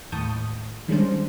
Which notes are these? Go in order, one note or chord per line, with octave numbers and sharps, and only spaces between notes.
D#2 A2 A5 C#6 D#6 G6
D#3 G3 G#3 C#4 D4 C5